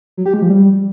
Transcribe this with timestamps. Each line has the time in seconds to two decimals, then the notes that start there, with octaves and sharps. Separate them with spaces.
0.17 F#3
0.26 G4
0.34 G#3
0.42 F3
0.50 G3